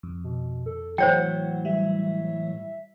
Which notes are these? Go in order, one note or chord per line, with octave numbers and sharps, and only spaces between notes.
F2
B2
A4
A2 E3 F#3 C5 C#5 F#5 G5
G3 E5